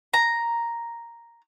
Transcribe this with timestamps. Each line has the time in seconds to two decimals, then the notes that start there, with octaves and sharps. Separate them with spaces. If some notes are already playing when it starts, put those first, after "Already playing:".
0.13 A#5